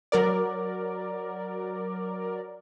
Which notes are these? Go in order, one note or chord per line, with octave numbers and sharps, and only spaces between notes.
F#3 A#4 D5